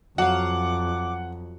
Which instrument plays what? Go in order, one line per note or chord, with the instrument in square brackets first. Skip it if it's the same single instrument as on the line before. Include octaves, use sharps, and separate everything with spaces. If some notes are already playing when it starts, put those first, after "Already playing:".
[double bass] F2 [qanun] F#3 F5 [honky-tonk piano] F#5 [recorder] D6